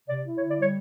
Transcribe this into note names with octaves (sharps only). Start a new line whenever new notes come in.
C3 D5
E4
C#5
D3
D5
G3 C#5